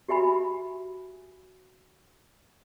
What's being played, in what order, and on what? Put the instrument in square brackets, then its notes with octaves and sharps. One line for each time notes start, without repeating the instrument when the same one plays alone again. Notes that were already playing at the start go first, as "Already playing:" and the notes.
[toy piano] F#4 G4 E5 G#5 B5